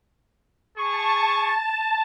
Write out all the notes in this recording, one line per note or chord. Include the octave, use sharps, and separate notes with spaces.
G#4 A5 C#6